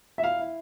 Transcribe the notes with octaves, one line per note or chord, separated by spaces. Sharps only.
E5
E4 F5
E4